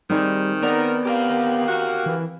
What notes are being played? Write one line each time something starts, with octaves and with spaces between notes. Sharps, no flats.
D#3 G3 C4 D#4 G#4
B3 A#4 D5
G4 A#4 F5
F#4
E3